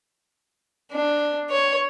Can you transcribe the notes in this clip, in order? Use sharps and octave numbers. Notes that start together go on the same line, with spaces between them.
D4
C#5